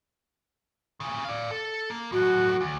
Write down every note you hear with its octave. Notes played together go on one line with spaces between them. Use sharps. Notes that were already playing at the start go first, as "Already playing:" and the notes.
A#2 C#3
D5 F5
A4
A#3
A2 F#3 F#4
D2